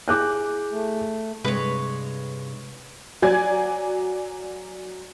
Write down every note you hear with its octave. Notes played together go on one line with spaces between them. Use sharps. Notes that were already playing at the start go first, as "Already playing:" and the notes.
E4 G#4 G#5 D6 F#6 G6
A3
G2 C3 G#3 B4 C#5
F#3 D5 G#5 G#6